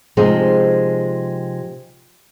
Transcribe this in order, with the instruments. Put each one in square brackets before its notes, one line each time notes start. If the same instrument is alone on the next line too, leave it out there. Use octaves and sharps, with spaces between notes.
[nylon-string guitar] C3 F3 G#3 D#4 G#4 C5